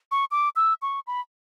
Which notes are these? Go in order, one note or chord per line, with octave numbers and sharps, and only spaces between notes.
C#6
D6
E6
C#6
B5